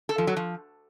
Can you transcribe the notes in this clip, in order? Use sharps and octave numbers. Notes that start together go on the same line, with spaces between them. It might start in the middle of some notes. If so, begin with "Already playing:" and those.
A4
F3
F#3
F3